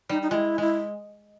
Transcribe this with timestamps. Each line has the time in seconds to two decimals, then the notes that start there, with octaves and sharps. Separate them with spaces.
0.09 G3 D#4
0.22 D#4
0.30 G#3 E4 F4
0.58 G#3 E4